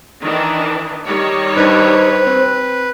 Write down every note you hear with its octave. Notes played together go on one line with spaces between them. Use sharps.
D#3 E3 D4
D#3 G3 C#5
G2 D4 D#4 B4 C5
C4